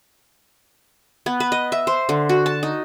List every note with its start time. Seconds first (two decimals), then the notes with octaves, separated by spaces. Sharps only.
1.26 B3
1.40 B4
1.52 D#5
1.72 E5
1.87 C5
2.09 D3
2.29 F#4
2.46 A5
2.63 D#4